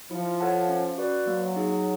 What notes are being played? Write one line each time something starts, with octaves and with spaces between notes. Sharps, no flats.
F3 E4
A4 C#5 F#5 A5
C#4
F#4 B4 D5
F#3 A#3
D#4 G#4